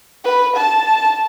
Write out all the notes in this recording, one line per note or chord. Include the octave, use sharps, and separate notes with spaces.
B4
A5